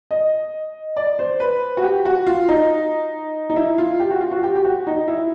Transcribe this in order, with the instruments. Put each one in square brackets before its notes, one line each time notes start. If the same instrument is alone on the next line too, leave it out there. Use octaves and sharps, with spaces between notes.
[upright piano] D#5
D5
C5
B4
F#4
G4
F#4
F4
D#4
D#4
E4
F4
G4
F#4
F4
F#4
G4
G4
F#4
D#4
E4